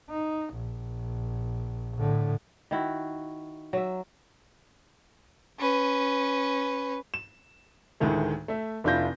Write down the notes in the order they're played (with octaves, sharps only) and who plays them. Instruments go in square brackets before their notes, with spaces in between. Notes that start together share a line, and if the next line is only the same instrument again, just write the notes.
[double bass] D#4
A#1
A2 D3
[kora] D#3 E4 F#4
F#3 E5
[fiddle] C#4 B4
[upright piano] E7
D2 A2 D#3 G#3 A3
A3 E5
F1 D4 E4 F4 G6 A#6